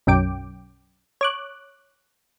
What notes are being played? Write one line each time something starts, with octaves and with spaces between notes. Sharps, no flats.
B1 F#2 G5 D6
C#5 D6 F#6